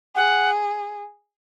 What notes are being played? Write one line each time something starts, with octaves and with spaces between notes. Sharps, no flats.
G#4 F#5